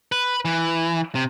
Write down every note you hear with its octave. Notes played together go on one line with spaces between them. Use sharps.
B4
E3
C3